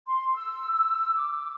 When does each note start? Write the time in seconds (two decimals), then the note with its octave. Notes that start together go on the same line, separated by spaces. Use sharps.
0.07 C6
0.35 E6
1.14 D6